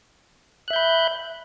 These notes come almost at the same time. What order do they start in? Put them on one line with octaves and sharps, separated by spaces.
F#6 E5 G6 B5